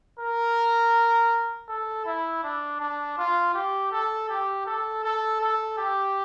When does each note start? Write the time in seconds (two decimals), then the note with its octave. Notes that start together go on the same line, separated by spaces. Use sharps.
0.19 A#4
1.68 A4
2.05 E4
2.43 D4
2.80 D4
3.17 F4
3.54 G4
3.91 A4
4.29 G4
4.66 A4
5.04 A4
5.41 A4
5.78 G4